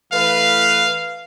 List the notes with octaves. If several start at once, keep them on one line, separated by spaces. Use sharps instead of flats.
E3 A3 B4 F5